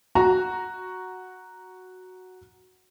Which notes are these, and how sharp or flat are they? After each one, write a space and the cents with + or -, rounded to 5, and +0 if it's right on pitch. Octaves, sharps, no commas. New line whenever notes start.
F#4 +0 A#5 +0